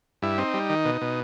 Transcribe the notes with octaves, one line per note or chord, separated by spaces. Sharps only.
G2 E4
C4 D#4
G3
D#3
B2
B2